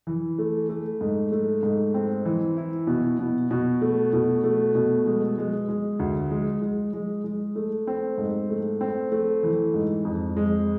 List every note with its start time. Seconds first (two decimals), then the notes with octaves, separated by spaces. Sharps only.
0.07 E3
0.39 A3
0.69 A3
1.01 G#2
1.32 A3
1.63 G#2
1.94 C4
2.25 E3
2.57 E4
2.87 B2
3.19 B2
3.51 B2
3.82 A3
4.13 B2
4.44 A3
4.75 B2
5.06 G#3
5.38 G#3
5.69 G#3
5.99 D2
6.31 G#3
6.62 G#3
6.93 G#3
7.24 G#3
7.56 A3
7.87 C4
8.18 G#2
8.50 A3
8.81 C4
9.12 A3
9.43 E3
9.74 G#2
10.05 F2
10.37 G#3